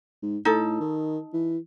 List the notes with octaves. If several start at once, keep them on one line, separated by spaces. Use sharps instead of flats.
G#2
A2 D#4 A4
D#3
E3